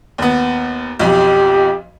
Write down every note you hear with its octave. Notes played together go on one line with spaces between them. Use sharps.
D#2 B3
B1 F2 G4